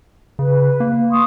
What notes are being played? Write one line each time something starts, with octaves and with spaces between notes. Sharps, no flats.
C#3 B4
A#3
C6 C#6 D#6